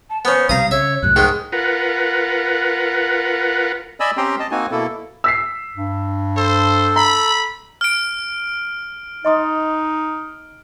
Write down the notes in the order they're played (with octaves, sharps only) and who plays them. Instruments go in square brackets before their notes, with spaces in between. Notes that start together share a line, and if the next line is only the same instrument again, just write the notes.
[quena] A5
[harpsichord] B3 C#4 [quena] C5
[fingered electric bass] B1 C3 G3 [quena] F5 [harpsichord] A#5 D#6
[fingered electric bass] C#3 [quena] C#5 [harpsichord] E5
[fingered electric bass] C2 F#2 A2 [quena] F#6
[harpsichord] G#2 D#3 G#3
[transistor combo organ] F4 A#4 B4 F#5
[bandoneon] D5 D#5 G#5 B5 E6
C4 C#4 G4 G5 A#5 C6
D#5 A5
A#3 C4 D#4 F#4 G#5
B2 A#3 E4 A4
[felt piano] E6 B6 C7
[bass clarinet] G2
[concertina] A4 [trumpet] C5
[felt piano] A#5 [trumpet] B5
[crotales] F6 D7
[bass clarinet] D#4 [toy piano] D#5 C6 D#6